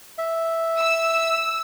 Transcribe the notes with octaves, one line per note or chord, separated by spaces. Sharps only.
E5
E6